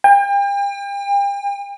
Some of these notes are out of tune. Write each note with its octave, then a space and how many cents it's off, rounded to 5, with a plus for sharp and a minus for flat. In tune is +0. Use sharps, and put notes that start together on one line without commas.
G5 +40